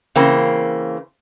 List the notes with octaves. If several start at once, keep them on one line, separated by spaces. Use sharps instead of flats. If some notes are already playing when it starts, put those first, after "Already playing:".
C#3 E3 A#3 C4